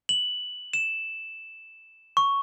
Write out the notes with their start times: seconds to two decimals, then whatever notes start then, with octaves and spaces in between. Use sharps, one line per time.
0.09 F#7
0.73 E7
2.17 C#6